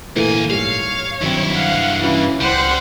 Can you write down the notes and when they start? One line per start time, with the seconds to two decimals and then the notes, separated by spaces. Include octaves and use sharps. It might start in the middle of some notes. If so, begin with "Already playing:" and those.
0.16 D2 A#2 E3 A3 A#3 G#5
0.50 G#2 G3 C#5 F5
1.22 G2 D#3 F#3 C4 E4
1.53 F5 F#5
2.02 E3 F#3 C#4 F4
2.41 C#2 G3 C5 F#5